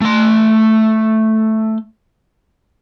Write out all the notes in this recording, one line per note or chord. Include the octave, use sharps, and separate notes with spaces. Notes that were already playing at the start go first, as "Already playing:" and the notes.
A3 C6